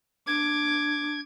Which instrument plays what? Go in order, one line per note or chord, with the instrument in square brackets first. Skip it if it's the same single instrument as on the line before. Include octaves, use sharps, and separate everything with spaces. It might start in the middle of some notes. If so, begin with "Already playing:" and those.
[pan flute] D4 [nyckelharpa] D6 [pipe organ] G#6